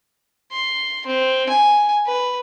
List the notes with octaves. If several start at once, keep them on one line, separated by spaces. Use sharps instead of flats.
C6
C4
G#5
B4